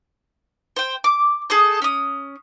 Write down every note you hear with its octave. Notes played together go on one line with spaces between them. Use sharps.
C5 G5
D6
G#4 A4 D#6 G6
C#4 D#6